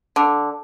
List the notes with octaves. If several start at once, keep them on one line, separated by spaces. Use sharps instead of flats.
D3